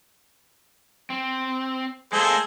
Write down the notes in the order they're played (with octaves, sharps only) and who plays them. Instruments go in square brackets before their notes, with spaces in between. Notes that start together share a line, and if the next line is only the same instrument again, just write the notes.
[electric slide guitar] C4
[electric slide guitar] G#3 A#3 [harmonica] G#4 A4 C5